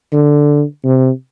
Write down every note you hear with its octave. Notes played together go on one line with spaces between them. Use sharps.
D3
C3